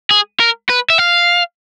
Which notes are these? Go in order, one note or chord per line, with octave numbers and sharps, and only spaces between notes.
G#4
A#4
B4
E5
F5